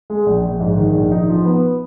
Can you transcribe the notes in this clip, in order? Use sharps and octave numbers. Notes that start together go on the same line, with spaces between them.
G#3
A#1
A#1
G#2
D#3
A#1
D#4
F3
B3